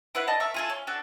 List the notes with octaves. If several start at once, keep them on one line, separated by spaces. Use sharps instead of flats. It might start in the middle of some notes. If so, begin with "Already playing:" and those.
E4 B4 F5 F#5
D5 D#5 A5
A#4 E5 A5 C#6
F4 G#4 A4
C#4
D4 F#4 A4